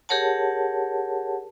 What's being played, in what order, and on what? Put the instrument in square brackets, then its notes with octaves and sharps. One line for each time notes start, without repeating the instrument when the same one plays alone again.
[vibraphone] G4 G#4 A#4 C#5 F#5 A5